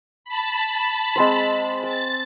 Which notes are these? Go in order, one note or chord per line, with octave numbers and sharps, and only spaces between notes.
A5 B5
G#3 C4 C5
G5 A6